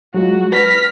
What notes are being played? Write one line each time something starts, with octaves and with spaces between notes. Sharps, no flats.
F#3 G#3 F4 F#4
B4 F6 A#6 B6